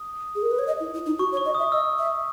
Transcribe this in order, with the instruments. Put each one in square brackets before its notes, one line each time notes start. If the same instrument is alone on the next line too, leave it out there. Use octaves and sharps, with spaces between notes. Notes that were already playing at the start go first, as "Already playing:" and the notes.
Already playing: [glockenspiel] D#6
[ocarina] G#4
A#4
B4
C#5
D#5
E4
E4
D#4
[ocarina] F#4 [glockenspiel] C#6
[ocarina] C#5
[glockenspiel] C#6
[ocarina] D#5
[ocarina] E5 [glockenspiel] D#6
[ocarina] D#5 [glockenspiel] E6
[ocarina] E5